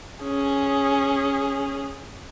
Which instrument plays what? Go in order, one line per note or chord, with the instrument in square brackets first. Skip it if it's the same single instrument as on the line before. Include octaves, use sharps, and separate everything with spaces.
[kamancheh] C#4 G#4